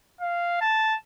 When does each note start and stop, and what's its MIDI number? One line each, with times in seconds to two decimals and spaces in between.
0.21 0.57 77
0.61 0.95 81